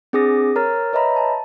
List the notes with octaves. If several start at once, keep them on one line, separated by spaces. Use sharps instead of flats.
C4 D4 G#4 D6 D#6 A#6
A#4 C#5 A#5 F6 A6
B4 C#5 D#5 E5 A#5 B5
A5